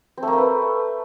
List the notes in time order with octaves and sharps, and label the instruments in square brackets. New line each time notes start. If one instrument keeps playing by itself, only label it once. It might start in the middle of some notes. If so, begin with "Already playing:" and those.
[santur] C4
A3
A#3
A3
B4